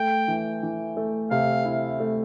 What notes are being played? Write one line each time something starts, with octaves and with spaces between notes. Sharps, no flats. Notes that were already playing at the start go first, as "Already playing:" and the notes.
Already playing: A3 G5
E3
E3
A3
C3 F5
E4
A3